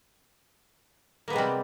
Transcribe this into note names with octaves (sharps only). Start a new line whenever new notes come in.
C3 G3 G#3 A#3 B3